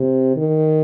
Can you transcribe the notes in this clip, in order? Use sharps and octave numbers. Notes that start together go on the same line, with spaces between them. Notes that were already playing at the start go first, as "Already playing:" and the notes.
Already playing: C3
D#3